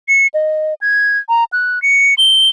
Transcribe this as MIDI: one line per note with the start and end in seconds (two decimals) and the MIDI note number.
0.09 0.27 97
0.34 0.74 75
0.81 1.18 92
1.29 1.44 82
1.53 1.82 90
1.82 2.14 97
2.18 2.49 103